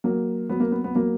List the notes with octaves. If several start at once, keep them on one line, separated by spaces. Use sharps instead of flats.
F#3 A#3
F#3 B3
A#3
B3
B3
F#3 A#3